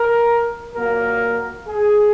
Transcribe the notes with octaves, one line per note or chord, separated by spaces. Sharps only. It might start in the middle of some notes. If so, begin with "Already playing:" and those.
Already playing: A#4
A#2 F#3 A#3 A#4
G#4